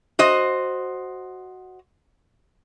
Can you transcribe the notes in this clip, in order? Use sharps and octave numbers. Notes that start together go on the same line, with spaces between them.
F#4 C5 D#5